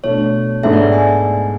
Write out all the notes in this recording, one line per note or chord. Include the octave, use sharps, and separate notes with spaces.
B2 A3 D4 C#5
G#2 G#3 B3 D4 A4 E5
D5
G#5